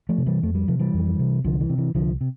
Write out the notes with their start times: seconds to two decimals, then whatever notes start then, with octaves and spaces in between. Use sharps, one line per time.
0.09 F3 A3
0.18 C3
0.26 E3 G3
0.43 F2 A3
0.55 G3
0.68 C3 F3
0.79 E3 G3
0.94 F2
1.19 C3
1.44 C2 D3 F3
1.61 E3
1.69 C3
1.78 E3
1.95 C2 D3 F3
2.21 C3